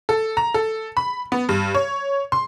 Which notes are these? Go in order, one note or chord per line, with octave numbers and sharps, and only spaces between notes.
A4
A#5
A4
B5
B3
G2
C#5
C6